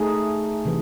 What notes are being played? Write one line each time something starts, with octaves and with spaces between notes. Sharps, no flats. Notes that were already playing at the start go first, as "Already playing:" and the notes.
Already playing: A3 D#4 G#4
C3 E3